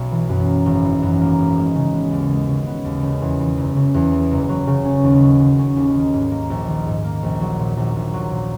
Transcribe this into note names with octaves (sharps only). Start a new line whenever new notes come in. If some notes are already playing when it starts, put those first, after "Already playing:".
Already playing: B1 B2
E3
F#2
A#3
G#1
E3
F#2
A#3
G#1
G#3
C#3
B3
D#2
G#3
C#3
B3
D#2
C#3
E2
E3
F#1
C#3
E2
E3
F#1
F#3
C#3
C#4
D#2
F#3
C#3
C#4
D#2
D#3
G#2
A#3
A#1
D#3
G#2
A#3
A#1
F#3
A#2
A#1
A#1
F#3
A#2